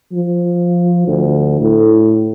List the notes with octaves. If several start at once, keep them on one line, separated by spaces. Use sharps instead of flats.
F3
D2
A2